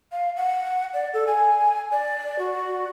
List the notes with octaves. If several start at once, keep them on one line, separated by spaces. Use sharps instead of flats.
F5
F#5
D5
A4
G#5
D5
F#4